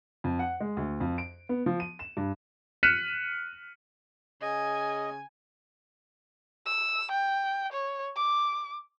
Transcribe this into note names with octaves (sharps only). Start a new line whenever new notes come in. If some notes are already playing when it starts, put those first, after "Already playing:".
F2
F#5
G#3
D2
F2
D7
B3
F3
D#7
E7
G2
F6 F#6 B6 C#7 D#7 E7
C#3 D#5 G#5
E6
G5
C#5
D6